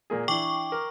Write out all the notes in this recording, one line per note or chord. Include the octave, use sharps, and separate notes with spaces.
A#2 A#3 G#4
E3 D4 E4 G5 C#6 D6
A#4